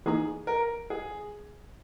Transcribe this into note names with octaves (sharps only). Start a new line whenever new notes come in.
E3 A#3 D#4 G#4
A#4
G#4